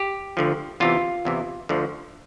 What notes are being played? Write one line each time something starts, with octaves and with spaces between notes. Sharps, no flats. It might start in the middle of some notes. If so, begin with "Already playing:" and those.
Already playing: G4
D2 D3 F3
E2 C3 E3 F4
E2 C3 E3
D2 D3 F3